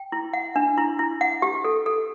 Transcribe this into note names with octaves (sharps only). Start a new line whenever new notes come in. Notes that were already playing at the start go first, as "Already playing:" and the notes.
Already playing: G5
E4
F#5
D4
E4
E4
F#5
G4
A4
A4